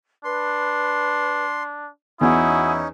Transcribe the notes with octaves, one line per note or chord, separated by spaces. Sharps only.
D4 B4 C6
E2 C#4 D#4 E4 F#4 G#5 D#6